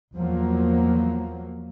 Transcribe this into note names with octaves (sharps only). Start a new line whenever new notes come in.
E2 F3 F#3 A#3